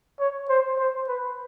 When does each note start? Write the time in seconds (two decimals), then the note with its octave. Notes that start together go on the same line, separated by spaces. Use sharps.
0.20 C#5
0.49 C5
0.79 C5
1.08 B4